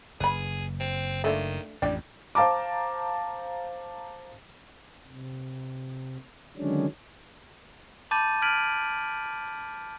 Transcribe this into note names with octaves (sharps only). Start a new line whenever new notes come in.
F#1 G#4 B4 B5
C4
D#3 A3 D4 F4
A1 F2 G3 D4 G5
C5 F5 A5 A#5 D6
C3
D3 D#3 F#3 G#3 C#4 D4
A5 B5 D6 G6 A6 D#7
F6 G#6 B6 D7 D#7 F#7